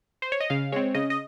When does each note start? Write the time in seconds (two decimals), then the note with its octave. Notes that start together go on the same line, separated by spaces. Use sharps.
0.22 C5
0.32 C#5
0.40 D#5
0.50 C#3 F5
0.72 G#3 C4 C#5
0.95 C#3 D#5
1.10 D#5